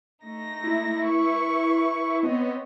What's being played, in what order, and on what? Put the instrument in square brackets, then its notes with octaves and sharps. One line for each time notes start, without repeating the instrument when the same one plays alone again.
[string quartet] A3 D#4 A#6
[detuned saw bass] E4
[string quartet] B4 C#6
[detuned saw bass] B3 [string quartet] C4 C#5 D#5